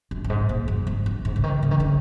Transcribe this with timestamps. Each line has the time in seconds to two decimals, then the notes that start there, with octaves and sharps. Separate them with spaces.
0.11 F#2
0.24 F#2
0.30 G#2
0.49 A#2
0.68 F#2
0.87 G#2
1.06 F#2
1.25 G#2
1.36 C#3
1.44 D#3
1.63 C#3
1.71 D#3
1.80 C#3